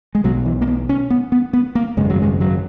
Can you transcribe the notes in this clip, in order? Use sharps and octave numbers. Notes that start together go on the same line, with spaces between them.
G#3
B1 B2 F#3
E3
A#3
B3
C#4
B3
B3
B3
A#3
G#1 F#2 C#3 G#3
F#3
G#3
F#3